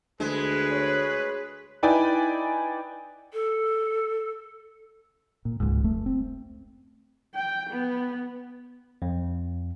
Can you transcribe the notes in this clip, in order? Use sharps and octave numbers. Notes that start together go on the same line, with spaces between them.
D2 G#3 G#4 B4
C#5
D#4 E4 B4 D5 G5 G#5
A4
A#2
C#2 G#2
F1 A3
C4
G5
B3
F2